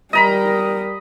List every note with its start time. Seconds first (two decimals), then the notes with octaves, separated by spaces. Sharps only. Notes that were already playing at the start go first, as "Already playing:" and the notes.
0.13 G3 A#4 D#5 A#5 B5